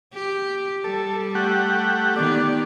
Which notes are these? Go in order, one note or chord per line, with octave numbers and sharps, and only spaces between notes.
G4
G3 A4
A3 G4 F#5
D#3 B3 G4 D5